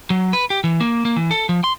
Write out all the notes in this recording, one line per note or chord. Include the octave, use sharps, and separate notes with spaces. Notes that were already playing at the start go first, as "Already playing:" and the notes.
F#3
B4
G4
E3
A#3
A#3
E3
A4
F3
C6